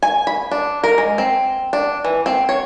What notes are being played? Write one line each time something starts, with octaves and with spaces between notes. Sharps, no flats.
G#5
B5
D4
A#4
G#3
C4
D4
E3
C4
C#5